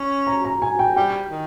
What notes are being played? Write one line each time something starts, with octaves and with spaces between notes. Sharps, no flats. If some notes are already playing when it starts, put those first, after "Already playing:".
Already playing: C#4
A#5
A#5
G#5
G5
G3 G5
D#3